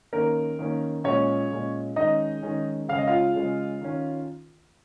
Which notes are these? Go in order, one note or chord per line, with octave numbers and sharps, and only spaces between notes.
D#3 A#3 C#4 A#4
D#3 A#3 C#4
A#2 G#3 C#4 C#5
A#2 G#3 C#4
D#3 G#3 C#4 D#4 D#5
D#3 G#3 C#4
C#3 G#3 C#4 F5
D#5
F4 F5
C#3 G#3 C#4
D#3 C#4